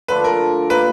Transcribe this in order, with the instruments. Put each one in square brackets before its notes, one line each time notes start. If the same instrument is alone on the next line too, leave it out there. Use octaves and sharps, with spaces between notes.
[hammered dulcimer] D3 F3 A3 D4 [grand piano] B4
[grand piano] A#4
[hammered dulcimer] A#2 G3 A#3 D#4 [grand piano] B4